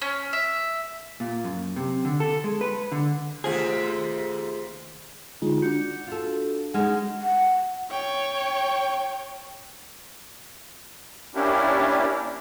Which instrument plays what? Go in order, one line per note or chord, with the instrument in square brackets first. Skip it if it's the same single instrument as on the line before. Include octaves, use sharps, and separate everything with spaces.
[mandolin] C#4
E5
[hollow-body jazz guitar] A#2
F#2
C3
D3
A4
G#3
B4
D3
[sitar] D#2 C3 C4 [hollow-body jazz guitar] A3 F4 G#4
[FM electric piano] D3 G#3 D#4 [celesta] F4
[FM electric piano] D4 F#4 [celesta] G6 C#7
[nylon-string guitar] F4 A4
[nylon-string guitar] G#3 C#4 D#4 [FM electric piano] G#4 [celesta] F#5 F6
[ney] F#5
[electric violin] C#5 G5
[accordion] A#3 C#4 D4 E4 G4